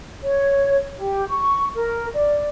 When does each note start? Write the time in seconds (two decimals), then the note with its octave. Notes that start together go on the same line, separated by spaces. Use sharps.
0.24 C#5
0.98 G4
1.29 C#6
1.75 A#4
2.15 D5